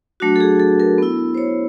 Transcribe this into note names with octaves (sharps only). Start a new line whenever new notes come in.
F#3 A3 D4 F#4
A4
G#4
A4
A#4
B3 E4
C5
C#5